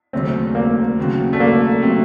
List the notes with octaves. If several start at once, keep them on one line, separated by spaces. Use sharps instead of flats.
D#2 C#3 F#3 A3 C4 C#4
A#3
D#2 C#3 F#3 C4 F#4
A3
A#3
C3 F#3 A3 C4